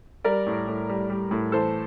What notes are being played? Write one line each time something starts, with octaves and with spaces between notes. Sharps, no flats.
G3 A#4 D5
A2
A2
G3
G3
A2
E3 A4 C5